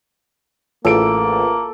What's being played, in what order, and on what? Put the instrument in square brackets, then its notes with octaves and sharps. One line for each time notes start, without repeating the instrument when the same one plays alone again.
[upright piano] A1 D7 [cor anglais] A#3 [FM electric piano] F4 G#4 B4 [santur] A4